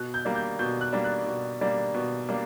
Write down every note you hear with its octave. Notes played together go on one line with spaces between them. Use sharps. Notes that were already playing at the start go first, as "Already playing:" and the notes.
Already playing: B2 F#6
G6
G3 A#3 D4
G6
B2 G6
F#6
G3 A#3 D4
F#6
B2
G3 A#3 D4
B2
G3 A#3 D4